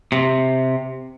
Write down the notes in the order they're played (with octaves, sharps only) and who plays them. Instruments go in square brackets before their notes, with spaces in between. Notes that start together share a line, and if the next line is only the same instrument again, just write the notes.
[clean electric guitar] C3